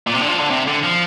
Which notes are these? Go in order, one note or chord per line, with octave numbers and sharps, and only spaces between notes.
A#2
C3
D3
F3
D3
C3
D3
F3